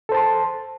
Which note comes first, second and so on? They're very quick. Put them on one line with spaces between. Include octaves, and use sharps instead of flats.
A4 C5 A5 C6